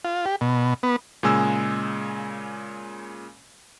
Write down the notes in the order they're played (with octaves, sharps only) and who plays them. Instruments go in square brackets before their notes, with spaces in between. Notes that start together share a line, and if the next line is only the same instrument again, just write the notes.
[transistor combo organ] F4
G4
B2
B3
[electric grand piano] A#2 C#3 G#3 G#5 E6